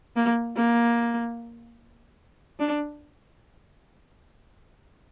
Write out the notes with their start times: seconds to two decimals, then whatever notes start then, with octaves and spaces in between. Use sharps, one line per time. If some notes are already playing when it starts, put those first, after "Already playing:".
0.16 A#3
0.57 A#3
2.60 D4